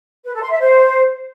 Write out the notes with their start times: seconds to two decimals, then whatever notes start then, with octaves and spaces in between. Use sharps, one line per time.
0.25 B4
0.33 A4
0.42 C6
0.51 E5
0.59 C5